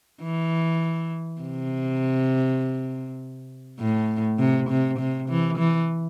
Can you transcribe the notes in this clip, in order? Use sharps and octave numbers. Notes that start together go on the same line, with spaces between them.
E3
C3
A2
C3
C3
C3
E3
E3